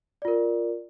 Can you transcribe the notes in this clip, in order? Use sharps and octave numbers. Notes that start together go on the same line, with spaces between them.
F4 A#4 D5